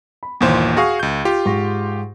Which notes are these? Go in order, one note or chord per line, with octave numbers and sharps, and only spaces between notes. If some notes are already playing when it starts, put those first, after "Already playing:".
B5
G1 D#2 A#2 E3 C5
F#4 G#4 F5 C#6 A#6
C#2 G6
F4 G4
G#2 C#6 A#6